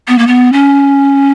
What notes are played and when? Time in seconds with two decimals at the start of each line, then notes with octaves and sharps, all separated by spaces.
0.08 B3
0.18 A#3
0.27 B3
0.53 C#4